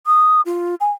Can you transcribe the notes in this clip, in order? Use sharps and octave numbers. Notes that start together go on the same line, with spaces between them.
D#6
F4
G#5